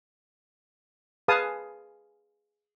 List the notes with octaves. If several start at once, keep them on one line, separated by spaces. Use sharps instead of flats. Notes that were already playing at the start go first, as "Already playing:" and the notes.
G#4 B4 F5 G#5 A5 D#6